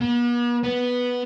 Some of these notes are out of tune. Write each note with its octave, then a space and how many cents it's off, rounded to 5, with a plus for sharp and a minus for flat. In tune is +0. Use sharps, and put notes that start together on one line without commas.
B3 -45
B3 -5